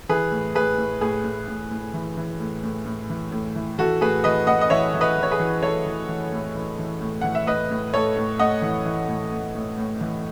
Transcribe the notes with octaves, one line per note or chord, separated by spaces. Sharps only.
E3 G#4 B4
A2
A2 G#4 B4
A2
A2 G#4
A2
A2
A2
E3
E3
A2
A2
A2
E3
A2
E3
E3 F#4 A4
A2 G#4 B4
E3 B4 D#5
A2 D#5 F#5
D#5
E3 C#5 E5
E3
B4 D#5
E3
C#5
G#4 B4
E3
E3 A4 C#5
E3
E3
A2
E3
E3
A2
E3 F#5
E5
A2 B4 D#5
A2
A2 A4 C#5
A2
A2 D#5 F#5
E3
E3
A2
A2
A2
A2
E3